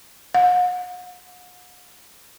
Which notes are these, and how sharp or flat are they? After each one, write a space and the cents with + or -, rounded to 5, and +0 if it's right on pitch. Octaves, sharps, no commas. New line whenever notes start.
F#5 -40